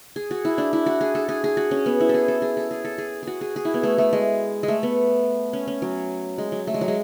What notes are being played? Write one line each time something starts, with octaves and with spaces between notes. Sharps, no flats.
G#4
F#4
E4
D4
E4
F#4
G#4
A4
G#4
G#4
F#4
C#4
B3
E4
A4
G#4
A4
G#4
A4
G#4
A4
G#4
F#4 G#4
G#4
G#4
E4
B3
A3
A3
G#3
G#3
A3
B3
C#4
C#4
F#3
G#3
F#3
A3
G#3
F#3
G#3